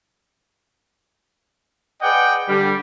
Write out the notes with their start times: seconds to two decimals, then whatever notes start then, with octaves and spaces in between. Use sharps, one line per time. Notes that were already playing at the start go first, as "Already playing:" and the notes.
2.02 G#4 B4 D5 D#5 F#5 G5
2.48 D3 G3